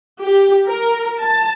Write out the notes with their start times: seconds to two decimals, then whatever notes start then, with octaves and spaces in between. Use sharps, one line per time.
0.22 G4
0.66 A#4
1.23 A5